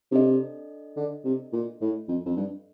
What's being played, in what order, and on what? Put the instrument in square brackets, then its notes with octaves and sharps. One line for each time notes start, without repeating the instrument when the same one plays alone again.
[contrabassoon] C3 [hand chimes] D4 A4 D#5
[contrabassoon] D3
C3
A#2
A2
F2
F2
G2